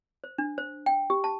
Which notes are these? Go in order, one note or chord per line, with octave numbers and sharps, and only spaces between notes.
C5
D4
C5
G5
G4
A5